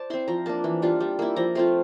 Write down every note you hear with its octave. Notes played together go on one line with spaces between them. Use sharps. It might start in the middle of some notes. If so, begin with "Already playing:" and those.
Already playing: C5 D5 A5
C4 E4 C6
F3 A#5
A#3 D4 A5
E3
G3 D4 F4
G3
A#3 E4
F3 A#5
A3 C4 F4 C6